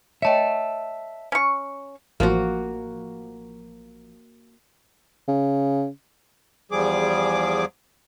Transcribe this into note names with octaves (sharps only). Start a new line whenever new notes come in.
C#5 D#5 E5 G5 A5
C#4 C#6
A1 F3 A#3 F#4
C#3
E2 F3 G3 G#4 D6